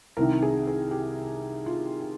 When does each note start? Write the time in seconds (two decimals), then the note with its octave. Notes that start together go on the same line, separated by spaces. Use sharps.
0.17 C2 C3 D#3 A#4
0.42 G#4
0.67 G#4
0.91 G4
1.66 F4